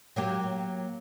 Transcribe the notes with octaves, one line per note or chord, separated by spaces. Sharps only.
F#3 A#3 G4